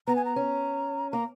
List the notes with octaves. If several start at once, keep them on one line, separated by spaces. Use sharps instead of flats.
B3 A#5
G#5
A#5
C#4
A#3 A#5